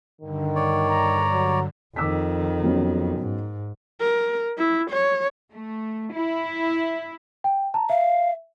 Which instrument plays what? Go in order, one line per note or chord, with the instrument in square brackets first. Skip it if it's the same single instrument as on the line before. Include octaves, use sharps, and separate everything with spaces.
[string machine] G2 D3 [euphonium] D#3
[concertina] C#5 D5
[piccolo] A#5
[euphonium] F#3
[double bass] F2 D#3 [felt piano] D6 E6 B6
[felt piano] F#3 B3 C#4
[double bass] G#2
[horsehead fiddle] A#4
E4
C#5
[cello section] A3
E4
[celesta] G5
A5 A#5
[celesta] E5 [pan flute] F5